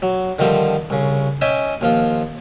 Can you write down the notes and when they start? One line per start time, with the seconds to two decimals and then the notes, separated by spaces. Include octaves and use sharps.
0.02 F#3
0.39 D3 D#3 F3 G3 C4
0.90 C2 C#3
1.41 C#4 D#5 E5 G5 G#5
1.81 D#2 F3 F4